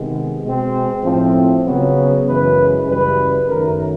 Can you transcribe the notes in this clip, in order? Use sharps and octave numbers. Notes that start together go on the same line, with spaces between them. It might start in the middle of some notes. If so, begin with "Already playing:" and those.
Already playing: C3 D#3 G#3 B3
B2 G#3 C4
A2 F3 A3 C4
C#3 F#3 B3
F#2 C#3 E3 G#3 B4
F#2 C#3 E3 G3 B4
F#2 D#3 F#3 A3 A#4